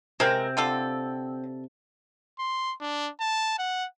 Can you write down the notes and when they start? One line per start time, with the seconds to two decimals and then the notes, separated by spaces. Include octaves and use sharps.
0.20 C3 G#3 C4 A#4
0.57 D3 F4 A4
2.39 C6
2.81 D4
3.20 A5
3.59 F#5